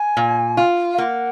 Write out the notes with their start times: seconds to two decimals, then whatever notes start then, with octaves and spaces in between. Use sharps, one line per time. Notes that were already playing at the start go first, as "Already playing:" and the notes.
Already playing: G#5
0.17 A#2
0.57 F4
0.94 F5
0.98 A#3 F#5